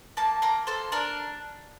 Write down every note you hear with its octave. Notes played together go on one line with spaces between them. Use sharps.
A#3 A5
A#3 A#5
A4 C5
D4 A#4